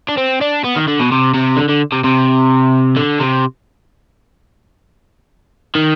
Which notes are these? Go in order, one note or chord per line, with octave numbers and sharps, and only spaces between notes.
D4
C4
D4
B3
D#3
D3
B2
C3
C3
D3
D3
C3
C3
D3
C3
D#3